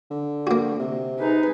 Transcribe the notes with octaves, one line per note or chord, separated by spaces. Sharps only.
D3
A#3 F#4
C3
D#4 G#4 B4